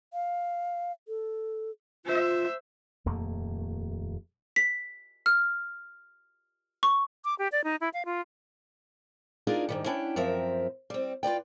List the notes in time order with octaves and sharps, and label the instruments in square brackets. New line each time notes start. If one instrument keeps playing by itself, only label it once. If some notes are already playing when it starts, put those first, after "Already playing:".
[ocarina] F5
A4
[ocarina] F4 [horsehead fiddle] C5 E5
[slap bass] D#1 F2 A3 A#3
[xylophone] B6
F6
C#6
[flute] D6
G4
D5
D#4
E4
F5
F4
[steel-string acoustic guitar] D4 D#4 F4 G#4 A#4
G#2 D#3 G3
C#4 D4 E4 F#5 G5
F#2 F3 C4 A#4 E5
G3 C4
F4 B4 D5 G5